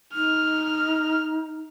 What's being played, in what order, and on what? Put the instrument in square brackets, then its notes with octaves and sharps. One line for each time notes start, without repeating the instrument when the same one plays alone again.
[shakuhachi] D#4 [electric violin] F6